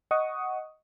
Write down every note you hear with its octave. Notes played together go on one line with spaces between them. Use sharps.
D#5 F#5 C#6 D#6